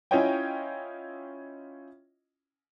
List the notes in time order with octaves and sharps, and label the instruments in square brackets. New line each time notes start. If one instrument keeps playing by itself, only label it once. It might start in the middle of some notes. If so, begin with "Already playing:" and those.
[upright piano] C#4 E4 F4 C#5 D#5 G5